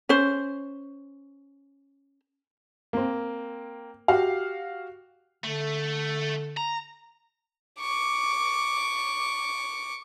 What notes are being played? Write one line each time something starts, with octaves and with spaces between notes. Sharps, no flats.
C#4 C5
A#3 C4
F#4 G4 F5
D3 A3
A#5
C#6 D6